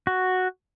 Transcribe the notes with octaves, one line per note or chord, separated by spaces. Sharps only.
F#4